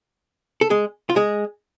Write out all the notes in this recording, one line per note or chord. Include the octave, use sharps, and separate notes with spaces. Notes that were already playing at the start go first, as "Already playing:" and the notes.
A4
G#3 G#4
F4
G#3 G#4